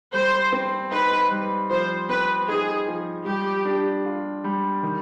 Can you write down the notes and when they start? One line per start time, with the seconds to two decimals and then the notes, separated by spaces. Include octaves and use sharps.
0.13 G3 C5
0.52 C4
0.92 D#4 B4
1.31 G3
1.70 F3 C5
2.09 C4 B4
2.48 D#4 G#4
2.87 F3
3.26 G3 G4
3.65 D4
4.05 F4
4.44 G3
4.83 D#3